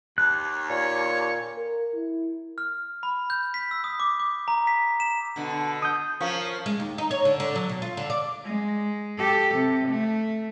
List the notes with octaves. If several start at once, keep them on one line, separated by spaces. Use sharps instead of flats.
D#2 F#6
A#2 C#5
A#4
E4
F6
B5
G6
B6
E6
D#6
D6
D6
A#5
B6
E7
B2 D3
D#6 G6
F3 C#4 A#4 F5 C#6
G#3
D#2
D#4
C#5
D3
D3
F#3
B2
F4
D3
D5
G#3
G4 A4
C3
A3